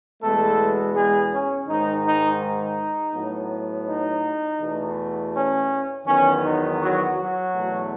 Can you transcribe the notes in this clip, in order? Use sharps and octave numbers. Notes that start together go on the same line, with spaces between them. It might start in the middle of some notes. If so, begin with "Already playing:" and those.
E2 B2 G#3 A3 B3 A4
G#3 G#4
C#4
G#2 D#3 G#3 D#4
D#4
D#4
A2 F#3 B3
D#4
E2 B2 A3
C#4
E2 D#3 F#3 B3 C#4
D#4
F#3 F#4
F#3 F#4
E2 B2 A3